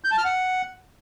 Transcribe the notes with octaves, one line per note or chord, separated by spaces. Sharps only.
G6
A5
F6
F#5